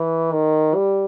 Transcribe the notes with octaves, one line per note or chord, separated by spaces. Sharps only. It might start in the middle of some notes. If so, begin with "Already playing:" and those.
Already playing: E3
D#3
G3